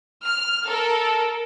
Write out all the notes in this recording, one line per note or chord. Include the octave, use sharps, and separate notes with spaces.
F6
A4 A#4